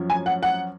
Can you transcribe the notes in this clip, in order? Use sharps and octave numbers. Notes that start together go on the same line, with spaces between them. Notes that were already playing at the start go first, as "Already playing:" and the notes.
Already playing: F#2 F3 C#4
G#5
F#5
F#5